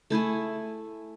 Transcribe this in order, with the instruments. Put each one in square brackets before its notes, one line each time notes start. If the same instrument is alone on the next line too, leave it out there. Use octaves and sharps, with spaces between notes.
[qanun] A3 E4 G#4 G#5